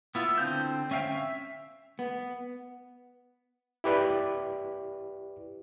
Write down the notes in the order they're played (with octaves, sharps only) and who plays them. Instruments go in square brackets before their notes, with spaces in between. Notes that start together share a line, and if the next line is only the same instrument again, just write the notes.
[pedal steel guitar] B3 E4 F4
D3 C4 G6
C#4 E5 F5 G5
E5
[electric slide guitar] B3
[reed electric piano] E4 G4 B4 D5